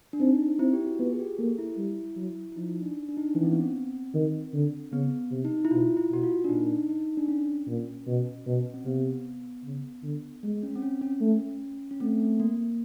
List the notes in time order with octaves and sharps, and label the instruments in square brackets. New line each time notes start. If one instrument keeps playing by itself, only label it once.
[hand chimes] D4
[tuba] C4 [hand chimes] D#4
[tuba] C4 [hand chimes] E4
[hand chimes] G4
F#4
[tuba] B3 [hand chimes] F4
[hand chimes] G#4
G4
[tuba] A#3 [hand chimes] A4
[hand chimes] E4
[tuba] G3
F#3
[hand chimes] E4
[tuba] F3 [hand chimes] D#4
[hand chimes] D4
D4
D#4
D4
[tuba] E3 [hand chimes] C#4
[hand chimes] C4
B3
C4
[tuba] D#3
D3
[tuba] C#3 [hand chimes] B3
[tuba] C3
[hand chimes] D#4
E4
[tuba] B2 [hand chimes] F4
[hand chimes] E4
[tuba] B2 [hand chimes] F#4
[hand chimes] F4
D4
[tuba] A#2 [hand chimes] D#4
[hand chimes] D#4
D4
C#4
[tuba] A#2
B2
B2
[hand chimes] C4
[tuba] C3 [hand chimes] B3
[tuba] C#3
D3
G#3
[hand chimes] C#4
C4
C#4
C#4
[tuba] A3
[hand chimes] C#4
[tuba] A3 [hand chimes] C4
[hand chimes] A#3